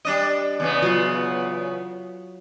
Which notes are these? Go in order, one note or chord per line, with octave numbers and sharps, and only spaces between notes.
G3 D4 D#5
E2 C#3 B3
F#3 F4